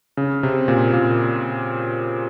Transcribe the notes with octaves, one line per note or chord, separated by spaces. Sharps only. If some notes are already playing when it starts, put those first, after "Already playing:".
C#3
C3
A#2
A#2